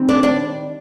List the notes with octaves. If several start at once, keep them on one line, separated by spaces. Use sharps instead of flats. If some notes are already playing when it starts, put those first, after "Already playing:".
Already playing: D#3 G3 C4
D4 D5
D4 D5